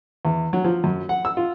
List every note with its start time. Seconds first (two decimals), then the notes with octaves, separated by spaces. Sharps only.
0.25 E2
0.53 F#3
0.64 F3
0.84 F#2
1.09 F#5
1.25 E6
1.37 F4